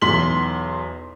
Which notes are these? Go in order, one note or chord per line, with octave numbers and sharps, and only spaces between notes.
B1 E2 C6 B6 F#7